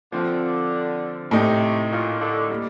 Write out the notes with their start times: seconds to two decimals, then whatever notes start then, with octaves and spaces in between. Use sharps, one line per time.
0.12 D3 F3 C4 F4
1.31 A2 C3 A3 D#4 G4
1.91 A#2
2.20 D3
2.50 G3 A#3 D4